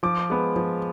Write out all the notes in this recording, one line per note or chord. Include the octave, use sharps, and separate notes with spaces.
F3 D6
G#3 B3
F3